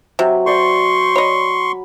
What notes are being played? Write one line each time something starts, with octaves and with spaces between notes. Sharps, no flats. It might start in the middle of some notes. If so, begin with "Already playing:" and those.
C3 F#3
C5 D5 C6 C#6
C#5 D#5 B5